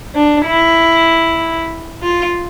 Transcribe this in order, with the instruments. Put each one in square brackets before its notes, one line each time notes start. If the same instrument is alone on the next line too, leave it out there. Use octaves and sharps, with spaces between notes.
[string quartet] D4
E4
F4